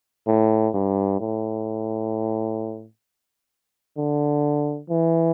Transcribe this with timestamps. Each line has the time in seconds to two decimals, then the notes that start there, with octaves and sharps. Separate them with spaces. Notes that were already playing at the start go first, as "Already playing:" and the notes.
0.27 A2
0.74 G2
1.20 A2
3.97 D3
4.90 E3